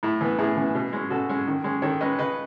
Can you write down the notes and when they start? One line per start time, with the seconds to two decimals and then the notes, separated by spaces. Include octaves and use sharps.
0.03 A2 E4
0.21 E3 B3
0.38 A2 E4 G#4
0.56 E3 B3
0.75 B2
0.93 G#3 C#4
1.10 B2 F#4 A4
1.29 G#3 C#4
1.47 D#3
1.64 G#3 C#4
1.82 D#3 A4 C#5
2.01 G#3 C#4 B4 D#5
2.18 C#3 B4 D#5